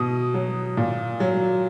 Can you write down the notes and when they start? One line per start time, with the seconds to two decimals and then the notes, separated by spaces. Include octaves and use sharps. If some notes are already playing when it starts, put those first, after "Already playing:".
Already playing: B2 D#6
0.34 F#3
0.77 A#2
1.20 F#3